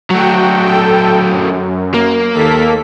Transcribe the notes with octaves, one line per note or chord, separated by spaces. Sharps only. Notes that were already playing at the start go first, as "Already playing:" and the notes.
F#3 A3 F#4 G5
A4 G5
F#2
A#3
D#2 A4 B6